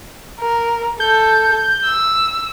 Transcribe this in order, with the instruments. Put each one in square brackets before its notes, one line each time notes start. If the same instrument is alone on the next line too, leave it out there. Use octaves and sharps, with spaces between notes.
[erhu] A#4
[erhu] A4 [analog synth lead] G6
[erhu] E6